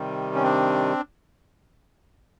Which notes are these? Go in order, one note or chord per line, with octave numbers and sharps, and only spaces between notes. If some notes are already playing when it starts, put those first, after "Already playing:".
Already playing: C3 D#3 G3
C#4
C4 D4